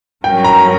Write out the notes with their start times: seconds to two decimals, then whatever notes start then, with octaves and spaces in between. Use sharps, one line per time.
0.24 G2 F#3 C#4 F#4 A#4 G5
0.44 A#5